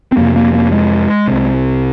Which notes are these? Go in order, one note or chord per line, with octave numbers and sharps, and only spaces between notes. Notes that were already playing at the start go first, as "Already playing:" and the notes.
C4
F2 C3 A#3
A#3
A#3
G#3
C2 C3